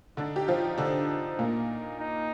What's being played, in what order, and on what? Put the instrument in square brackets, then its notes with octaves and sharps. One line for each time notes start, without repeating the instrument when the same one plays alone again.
[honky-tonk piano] D3 D4 [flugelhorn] D#4
[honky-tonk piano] G4
F3 F4
D3 D4
A#2 A#3
[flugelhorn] D#4